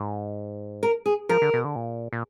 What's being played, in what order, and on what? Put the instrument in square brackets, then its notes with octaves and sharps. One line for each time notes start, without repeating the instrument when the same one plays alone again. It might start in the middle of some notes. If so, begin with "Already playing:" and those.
Already playing: [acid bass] G#2
[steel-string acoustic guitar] A#4
G#4
[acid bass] F3 [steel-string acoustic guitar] A#4
[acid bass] D3
B2
D3
A#2
A#2